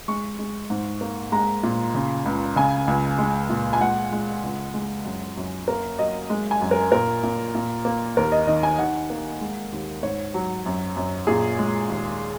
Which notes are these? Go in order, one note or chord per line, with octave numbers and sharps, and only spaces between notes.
G#3 C#6
G#3
G#2
A#3
G#3 A#5
A#2
C#3
C#2
C#3 G#5
C#2
G#3
A#2
G#5
G#3 F#5
G#3
C#2
G#3
F#2
F#2
A#3 A#4
F#3 D#5
G#3
G#5
F#2
A#4
A#2 A#4
A#2
A#2
A#3
D#2 A#4
D#5
D#3 D#5
G#5
D#3 F#5
A#3
G#3
D#2
G#2 C#5
F#3
F#2
F#2
A#2 G#4
G#3
D#2